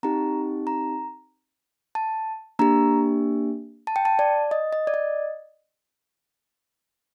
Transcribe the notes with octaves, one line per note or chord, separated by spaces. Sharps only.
C4 D#4 G4 A#5
A#5
A5
A#3 D4 G4 A#5
A5
G5
A5
D5
D#5
D#5
D5
D#5